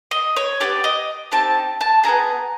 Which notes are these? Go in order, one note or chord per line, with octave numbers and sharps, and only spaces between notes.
D#5
C#5
B3 D#4 G4 D5
D#5
C4 D#4 G4 A5
A5
B3 E4 G#4 A#5